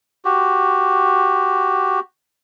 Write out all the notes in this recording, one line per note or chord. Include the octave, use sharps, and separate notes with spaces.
F#4 G4